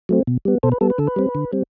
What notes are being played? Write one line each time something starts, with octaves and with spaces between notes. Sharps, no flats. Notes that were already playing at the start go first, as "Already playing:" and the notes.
F#3 A3 C4
B2
G3 B3
B2 A4 C5
B4
G3 B3 A4
B4
D3 A4
B4
G3 C4
D3
G3 C4